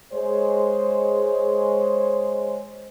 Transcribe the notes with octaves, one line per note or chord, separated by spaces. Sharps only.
G#3 C5 C#5